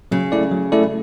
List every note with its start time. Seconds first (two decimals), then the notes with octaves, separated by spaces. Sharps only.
0.11 C#3 F#3
0.32 A3 E4 A4 D5
0.51 F#3
0.72 A3 E4 A4 D5